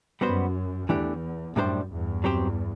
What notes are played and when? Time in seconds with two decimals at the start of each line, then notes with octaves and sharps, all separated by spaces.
0.21 F#2 G3 B3 F#4 C5
0.89 E2 E3 A3 D4 G4
1.56 F#2 A2 G3 D4 A4 C5
1.90 E2 G2
2.24 F#3 C4 G4 C5